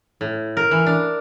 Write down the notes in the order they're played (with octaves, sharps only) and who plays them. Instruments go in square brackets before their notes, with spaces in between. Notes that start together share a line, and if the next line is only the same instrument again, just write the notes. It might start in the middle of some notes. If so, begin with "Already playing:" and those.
[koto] A2
A#4
E3
D4